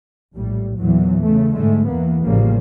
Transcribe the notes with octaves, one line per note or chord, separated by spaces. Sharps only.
A#1 A2 G3
E2 A#2 E3 F#3
C#3 A3
G#2 D3 G#3 A3
E2 E3 A#3 B3
A1 A2 C#3 F3 G3 A#3